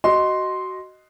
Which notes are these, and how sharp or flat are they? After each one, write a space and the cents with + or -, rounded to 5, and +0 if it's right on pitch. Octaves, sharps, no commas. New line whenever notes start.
F#4 +20 D#5 +0 C6 +0